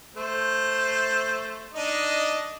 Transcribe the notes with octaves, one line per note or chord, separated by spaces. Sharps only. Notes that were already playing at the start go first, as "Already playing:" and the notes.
A3 C5
D4 D#4 D#5